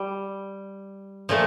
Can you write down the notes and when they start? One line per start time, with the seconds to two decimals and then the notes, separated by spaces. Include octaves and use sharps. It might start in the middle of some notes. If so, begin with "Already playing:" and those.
Already playing: G3
1.29 A#2 F3 A3